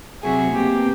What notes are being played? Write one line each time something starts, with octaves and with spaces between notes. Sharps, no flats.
C3 F#3 E4 F#4 G#4
B2 A#3 C4 G4